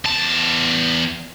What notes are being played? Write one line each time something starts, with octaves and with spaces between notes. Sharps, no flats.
E2 A5